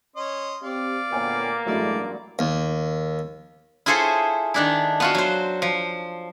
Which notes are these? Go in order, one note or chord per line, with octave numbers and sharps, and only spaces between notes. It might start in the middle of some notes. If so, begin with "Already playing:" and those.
C#4 D#5 C6
C4 G4 D5 F5
D2 A#2 A#3 B3 C#5 G5 G#5
A1 G2 F#3 G#3 A3 E4 D5
D#2
E4 F4 G#4 A4 C5 C#5
D#3 D4 E4
B3 F4 F#4
F#3 C5
F3